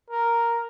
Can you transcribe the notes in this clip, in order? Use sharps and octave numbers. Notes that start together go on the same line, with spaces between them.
A#4